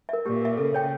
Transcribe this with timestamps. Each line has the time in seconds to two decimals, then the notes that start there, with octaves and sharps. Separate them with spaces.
0.09 A#4 E5
0.26 A#2 G4
0.41 A#4 E5
0.57 C#3 A4
0.74 C#5 G5